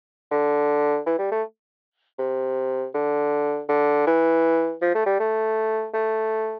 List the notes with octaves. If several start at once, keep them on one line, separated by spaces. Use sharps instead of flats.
D3
E3
G3
A3
C3
D3
D3
E3
F3
A3
G3
A3
A3